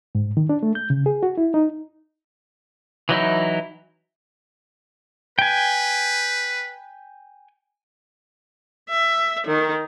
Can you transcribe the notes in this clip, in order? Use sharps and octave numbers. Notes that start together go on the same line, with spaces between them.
G#2
D#3
D4
A3
G6
C#3
G#4
F#4
E4
D#4
E3 F#3 D#4 E4
B4 G5 G#5
E5
D#3